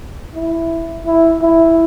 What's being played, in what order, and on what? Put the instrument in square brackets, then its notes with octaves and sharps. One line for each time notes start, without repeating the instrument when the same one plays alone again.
[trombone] E4
E4
E4